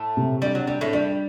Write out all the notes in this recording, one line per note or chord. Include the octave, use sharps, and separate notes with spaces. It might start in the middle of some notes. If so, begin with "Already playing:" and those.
Already playing: A2 A3
C3
G3 D4
F#3
G3 D4
A2 A3
G3 D4